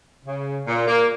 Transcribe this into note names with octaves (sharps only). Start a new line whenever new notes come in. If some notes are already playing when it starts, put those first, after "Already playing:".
C#3
A#2
A#3